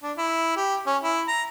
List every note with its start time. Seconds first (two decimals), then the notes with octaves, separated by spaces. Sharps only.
0.03 D4
0.17 E4
0.56 G4
0.86 C#4
1.03 E4
1.28 A#5